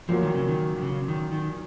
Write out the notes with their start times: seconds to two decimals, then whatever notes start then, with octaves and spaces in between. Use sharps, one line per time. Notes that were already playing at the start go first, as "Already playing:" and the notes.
0.09 A#2 F3 F#3 A#3
0.22 D#3
0.34 C#3
0.49 D#3
0.77 D#3
0.82 C#3
1.08 D#3
1.32 D#3